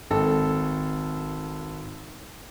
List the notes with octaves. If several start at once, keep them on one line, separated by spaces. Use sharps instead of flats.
G#1 A4